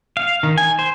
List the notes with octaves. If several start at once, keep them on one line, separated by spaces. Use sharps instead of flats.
F5
D#3
G#5
C5